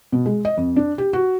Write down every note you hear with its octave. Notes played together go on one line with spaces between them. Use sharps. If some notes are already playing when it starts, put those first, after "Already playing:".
B2
G#3
D#5
F2
D4
G4
F#4